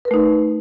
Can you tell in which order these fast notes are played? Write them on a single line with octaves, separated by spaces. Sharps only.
B4 A#4 A3 D#4